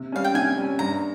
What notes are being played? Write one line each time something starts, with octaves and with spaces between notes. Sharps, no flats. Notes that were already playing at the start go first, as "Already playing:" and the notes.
Already playing: C3
G3 C#4 F5
G5
C3 G#5
G3
C#4
G2 A#5